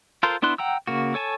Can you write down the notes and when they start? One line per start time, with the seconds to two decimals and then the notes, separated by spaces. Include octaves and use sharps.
0.23 F4 A4 A#4 C5
0.42 B3 D4 E4 C6 F#6
0.58 F#5 G5 A#5 E6
0.87 C#3 A#3 F#4
1.14 A4 C#5 G#5 A5